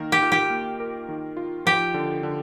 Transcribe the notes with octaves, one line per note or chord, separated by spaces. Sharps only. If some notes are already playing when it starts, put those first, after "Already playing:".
Already playing: D#3 A#3 A#4
G4
F4
G4
A#3
A#4
D#3
F4
F3 G4
D3
D3